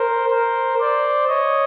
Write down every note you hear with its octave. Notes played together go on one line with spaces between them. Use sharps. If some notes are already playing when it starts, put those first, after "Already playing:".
Already playing: A#4 C5
A#4 C5
C5 D5
C#5 D#5